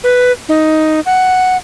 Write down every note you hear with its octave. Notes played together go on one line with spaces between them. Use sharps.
B4
D#4
F#5